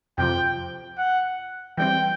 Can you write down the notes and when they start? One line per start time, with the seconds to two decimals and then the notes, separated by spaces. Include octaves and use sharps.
0.18 F2 C3 F3 G5
0.98 F#5
1.78 E3 G3 C4 G5